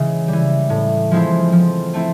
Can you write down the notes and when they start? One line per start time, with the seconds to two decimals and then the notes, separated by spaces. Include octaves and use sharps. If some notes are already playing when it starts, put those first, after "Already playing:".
Already playing: C#3 E3 G#3
0.28 E3 G3
0.70 A2
1.11 F3 G#3 C4 E4
1.52 F3
1.94 A3 C4 E4